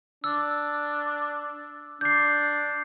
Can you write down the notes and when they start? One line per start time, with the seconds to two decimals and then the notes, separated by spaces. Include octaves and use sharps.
0.24 D4 E6
2.01 D4 G6 C7